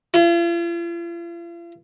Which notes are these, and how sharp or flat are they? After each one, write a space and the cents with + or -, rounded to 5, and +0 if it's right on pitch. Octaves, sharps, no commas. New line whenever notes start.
F4 -45